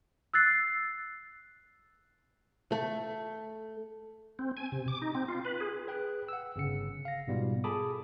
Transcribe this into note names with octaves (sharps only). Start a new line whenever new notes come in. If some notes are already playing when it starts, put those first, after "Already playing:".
E6 F#6 A6 C7
A3
C4
G#5
C3
D6
D#4
C4
F4
B4
G#4
G#4 B4 G5 F#6
F#5 E6
G1 C#3 C#7
F5 A#6
G#2 B2 G3 B3 F4
G#4 A4 A5 B5 D6 D#6